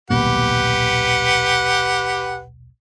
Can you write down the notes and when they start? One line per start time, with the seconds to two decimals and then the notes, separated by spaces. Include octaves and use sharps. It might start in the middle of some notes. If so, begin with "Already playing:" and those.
0.10 D#1 B1 A#2 G4 B4 F#5